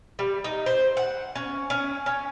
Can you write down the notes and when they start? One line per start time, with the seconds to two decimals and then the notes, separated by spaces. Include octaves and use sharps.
0.19 G3
0.44 D#4
0.66 C5
0.97 F#5
1.35 C#4
1.70 C#4
2.06 C#4